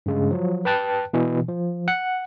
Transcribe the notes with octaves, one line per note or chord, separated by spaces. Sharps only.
G2 C#3 G#3
F3 F#3
B4 G5 A5 F#6
B2 E3
F3
F#5